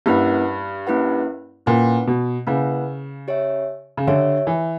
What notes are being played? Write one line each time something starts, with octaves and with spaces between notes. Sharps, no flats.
G2 A#3 C#4 E4 B4 F#5
A#3 C#4 E4 B4 F#5
A#2 A#3 C#4 E4 B4 F#5
B2
C#3 A#3 C#4 E4 B4 F#5
G4 C#5 E5
C#3
D3 G4 C#5 E5
E3